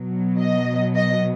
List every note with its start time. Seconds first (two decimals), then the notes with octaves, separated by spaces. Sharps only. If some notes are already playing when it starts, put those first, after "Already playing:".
Already playing: B2 F#3
0.39 D#5
0.95 D#5